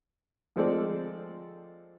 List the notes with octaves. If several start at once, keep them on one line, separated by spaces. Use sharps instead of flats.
D2 F3 G#3 C4 A4 D5